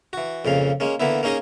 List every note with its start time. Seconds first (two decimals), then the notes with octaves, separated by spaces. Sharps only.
0.13 E3 F#4
0.45 F2 A#2 C#3 F5
0.80 G#3 A#3 C#4
1.00 D3 E3 A#3 B3 E4
1.23 A#3 C#4 D#4 G#4 D#5